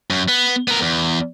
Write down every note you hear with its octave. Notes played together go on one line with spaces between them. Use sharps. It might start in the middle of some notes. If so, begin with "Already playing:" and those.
F#2
B3
B3 A#4
E2